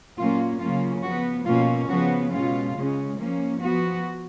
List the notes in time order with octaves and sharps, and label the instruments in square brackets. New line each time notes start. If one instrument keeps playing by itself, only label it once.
[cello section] A#2 F#3 A#3 C#4 F4
C#3 F#3 A#3 C#4 F4
F3 B3 F#4
B2 A#3 C#4 F4
C#3 F3 B3 F#4
B2 G#3 C#4 F4
C#3 G#3 C#4
F3 A#3 C#4
F3 B3 F#4